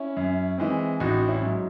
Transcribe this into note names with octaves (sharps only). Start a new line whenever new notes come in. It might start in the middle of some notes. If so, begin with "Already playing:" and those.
Already playing: C#4 E4
F#2
E3 G#3 C4
A1 D#4 F#4
C#4 E4
G#2 F#3